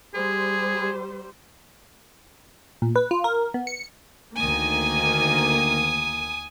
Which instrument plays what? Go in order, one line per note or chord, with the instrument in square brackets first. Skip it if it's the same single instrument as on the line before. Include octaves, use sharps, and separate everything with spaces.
[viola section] G3 C5 [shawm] G#4
[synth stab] A#2
B4
F4
A#4
B3
C#7
[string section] D2 D#3 A#3 [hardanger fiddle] G#5 D#6